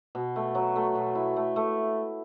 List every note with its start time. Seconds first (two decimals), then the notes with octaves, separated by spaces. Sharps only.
0.15 B2
0.36 A3
0.55 F#3
0.76 A3
0.95 B2
1.15 E4
1.36 A3
1.56 A3